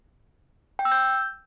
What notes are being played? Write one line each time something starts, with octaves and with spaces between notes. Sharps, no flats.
G5
E6
G6